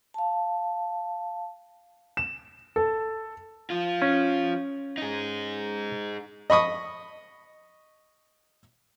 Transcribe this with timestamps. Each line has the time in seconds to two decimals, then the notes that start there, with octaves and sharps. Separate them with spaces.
0.14 F5 A5
2.17 E7
2.76 A4
3.70 F3 F4
4.02 C#4
4.98 D#4 G#4
6.50 D#5 B5 C#6 D#6